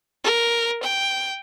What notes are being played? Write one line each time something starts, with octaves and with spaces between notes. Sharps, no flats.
A#4
G5